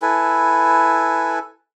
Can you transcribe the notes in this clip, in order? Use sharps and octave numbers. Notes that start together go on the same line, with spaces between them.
E4 A4 B4 G#5